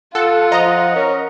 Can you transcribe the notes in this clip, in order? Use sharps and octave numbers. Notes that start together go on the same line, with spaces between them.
F4 A4 F#5
F3 D#5 A#5
C#4 A#4